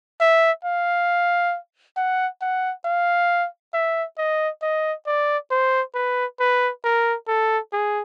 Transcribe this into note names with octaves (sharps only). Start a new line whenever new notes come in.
E5
F5
F#5
F#5
F5
E5
D#5
D#5
D5
C5
B4
B4
A#4
A4
G#4